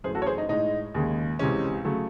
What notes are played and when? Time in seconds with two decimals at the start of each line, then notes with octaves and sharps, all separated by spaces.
0.04 F#2 E3 A3 G#4 C5
0.15 F#4 A4
0.22 C#5
0.26 G#4 C5
0.38 D#4
0.49 A2 G#3 D#4
0.95 D#2 C#3 G#3
1.39 C#2 C3 E3 G#3 C#4
1.85 C#3 F#3 A3